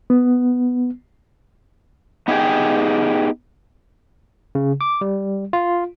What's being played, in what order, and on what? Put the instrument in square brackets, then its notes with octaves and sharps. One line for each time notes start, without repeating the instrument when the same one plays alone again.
[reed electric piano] B3
[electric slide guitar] B3 D#4 G4 G#4 G5
[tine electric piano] C#3
D6
G3
F4